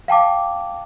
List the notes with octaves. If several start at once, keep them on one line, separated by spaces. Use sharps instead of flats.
F5 G5 A5 D6